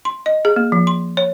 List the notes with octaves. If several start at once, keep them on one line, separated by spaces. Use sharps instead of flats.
C6
D#5
G#4
A#3
F3
C6
C#5